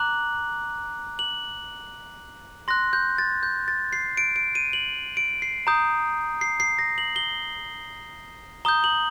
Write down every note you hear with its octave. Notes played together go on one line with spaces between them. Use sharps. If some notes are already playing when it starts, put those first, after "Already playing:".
Already playing: A#5 D6 F#6 F#7
F#7
C6 F#6 A#6
G6
A6
G6
A6
C7
D7
D7
D#7
F#7
D7
C7
A#5 D#6 G6
C7
C7
A#6
F#7
G7
A#5 D#6 G6 G7
F#7